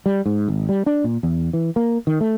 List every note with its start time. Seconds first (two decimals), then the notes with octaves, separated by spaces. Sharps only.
0.06 G3
0.26 G#2
0.48 G#1
0.69 G3
0.86 D4
1.04 A#2
1.23 E2
1.53 E3
1.76 A#3
2.07 D#3
2.21 A3